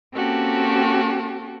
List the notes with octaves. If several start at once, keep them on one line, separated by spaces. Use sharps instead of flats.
A#3 C4 C#4 F#4 G4 A4